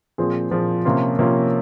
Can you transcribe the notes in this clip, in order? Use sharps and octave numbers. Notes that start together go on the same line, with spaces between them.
A#2 F3 C4 F4 G#4
A#2 F3 C4 F4 G#4
C3 F3 A#3 C#4 F4
C3 F3 A#3 C#4 F4